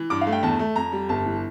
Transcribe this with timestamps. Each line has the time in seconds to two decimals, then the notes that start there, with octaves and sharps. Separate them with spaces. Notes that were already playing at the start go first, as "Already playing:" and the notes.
Already playing: E3
0.10 G2 D6
0.21 F5
0.27 A3
0.32 G5
0.43 E2 A5
0.59 A3
0.76 F2 A#5
0.92 G3
1.09 G1 A5
1.26 E3